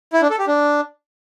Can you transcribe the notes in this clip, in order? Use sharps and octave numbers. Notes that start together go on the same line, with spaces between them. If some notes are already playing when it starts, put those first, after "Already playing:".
E4
D4
A4
G4
D4